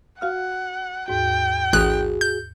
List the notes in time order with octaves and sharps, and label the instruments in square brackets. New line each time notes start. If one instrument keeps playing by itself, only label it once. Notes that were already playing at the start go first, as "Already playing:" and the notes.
[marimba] F#4 F5 F6 [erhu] F#5
[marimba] D#2 G#2 F#4 [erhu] G5
[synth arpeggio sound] A1 F#6 [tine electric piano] F#4 G#4 [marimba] D#6
[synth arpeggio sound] G6